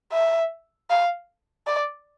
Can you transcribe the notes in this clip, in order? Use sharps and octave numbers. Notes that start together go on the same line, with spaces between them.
E5
F5
D5